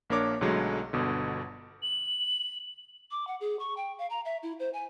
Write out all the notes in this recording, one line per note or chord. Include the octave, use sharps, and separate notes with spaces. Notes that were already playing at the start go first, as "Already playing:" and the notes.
A#1 A#3 D4 A#4 C#5 D6
B1 D3 F#3 G#3 A3
G1 B2 D3
F#7
D6
F#5
G#4
C#6
G5
F5
A#5
E5
E4
C5
G#5